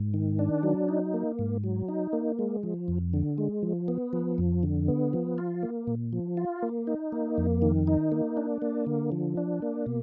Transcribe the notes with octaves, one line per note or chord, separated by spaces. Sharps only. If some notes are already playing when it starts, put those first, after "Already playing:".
Already playing: G#2
D#3
D4
F#3
D#4
A#3
G#2
F#3
D#4
A#3
G#3
F3
F2
D3
G#3
F3
B3
F3
F2
D3
B3
F3
F4
A#3
A#2
F3
F4
A#3
D#4
A#3
F2
D#3
D#4
A#3
D4
A#3
D3
F3
D4
A#3
B2